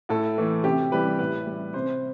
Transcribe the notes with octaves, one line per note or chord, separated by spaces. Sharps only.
A2 A4
E3 A3
C3 G4
E3 G3 B4
A2 B4
G3
C3 C5